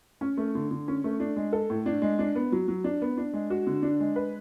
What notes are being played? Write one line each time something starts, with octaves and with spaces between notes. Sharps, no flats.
C#4
A3
D3
D3
C#4
A3
D4
G#3
A4
A2
D4
G#3
D4
B3
F#3
F#3
D4
B3
D4
G#3
F#4
D3
D4
G#3
B4